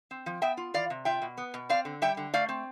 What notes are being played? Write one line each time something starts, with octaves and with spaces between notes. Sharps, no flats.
C4
F3
B3 E5 G5
F4
E3 D5 F5
C3
F4 E5 G5
B2
B3
B2
C4 D5 F5
D3
G3 E5 G5
D3
A3 D5 F5
C4